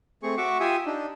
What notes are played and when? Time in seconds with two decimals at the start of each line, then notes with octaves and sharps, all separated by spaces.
0.23 A3 C4 G#4 C#6
0.38 F#4 E5 F#5 C#6 D6
0.60 F4 G4 E5 G#5 D#6
0.86 D4 D#4